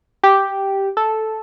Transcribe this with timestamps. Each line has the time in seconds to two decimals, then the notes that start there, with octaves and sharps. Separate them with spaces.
0.23 G4
0.97 A4